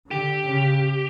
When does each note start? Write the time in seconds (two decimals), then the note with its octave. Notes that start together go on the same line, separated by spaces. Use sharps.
0.11 D3 G4
0.48 C#3